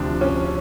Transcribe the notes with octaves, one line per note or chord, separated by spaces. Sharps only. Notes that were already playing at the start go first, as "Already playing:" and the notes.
Already playing: D2 C3 F3 D4
C#4